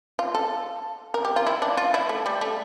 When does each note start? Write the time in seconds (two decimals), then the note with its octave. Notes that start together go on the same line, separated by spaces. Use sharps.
0.19 F4
0.35 A4
1.14 A#4
1.25 G4
1.36 F4
1.46 E4
1.62 D4
1.77 F4
1.94 E4
2.09 A3
2.26 G3
2.41 A3